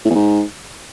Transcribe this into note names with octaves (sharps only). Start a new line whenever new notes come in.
A2
E2
G#2